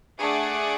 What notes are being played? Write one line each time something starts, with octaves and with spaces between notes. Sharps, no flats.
A3 D4 G#4 D5 F#5